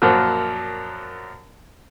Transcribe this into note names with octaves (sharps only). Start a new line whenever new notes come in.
F#2 A#2 F3 F#3